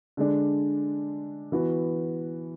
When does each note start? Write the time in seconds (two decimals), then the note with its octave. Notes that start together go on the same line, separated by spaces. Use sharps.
0.17 D3 G#3 D4
1.52 E3 B3 F#4